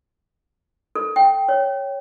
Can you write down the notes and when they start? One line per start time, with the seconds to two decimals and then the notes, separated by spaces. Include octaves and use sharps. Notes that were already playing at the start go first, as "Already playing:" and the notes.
0.95 A4
1.16 G5
1.48 C#5